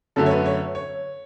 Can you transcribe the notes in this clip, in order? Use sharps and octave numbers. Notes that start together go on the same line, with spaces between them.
F#2 D3 A3 A4
C#5
B4
C#5
C#5